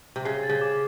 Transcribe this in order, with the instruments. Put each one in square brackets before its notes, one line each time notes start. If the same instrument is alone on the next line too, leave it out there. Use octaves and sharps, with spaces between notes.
[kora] C3
[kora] C#3 [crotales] C7
[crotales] A6
[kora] C#3
[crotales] D6